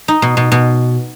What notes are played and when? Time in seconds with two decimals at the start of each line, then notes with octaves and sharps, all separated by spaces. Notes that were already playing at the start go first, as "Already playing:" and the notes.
0.08 D#4
0.22 B2
0.37 B2
0.52 B2